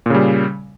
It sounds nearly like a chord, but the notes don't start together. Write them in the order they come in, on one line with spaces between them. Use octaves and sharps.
A#2 C#3 G3